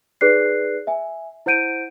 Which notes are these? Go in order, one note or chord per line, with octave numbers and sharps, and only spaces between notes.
D#4 G#4 B4 D5 F#6 C7
E5 G#5
E4 C5 F#5 G6 D7 D#7